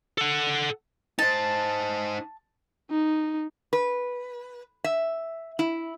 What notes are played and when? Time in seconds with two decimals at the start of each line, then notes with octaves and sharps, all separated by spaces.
0.18 A4 F#5
1.19 D#4 C5 A5
2.90 D#4
3.73 B4
4.84 E5
5.59 E4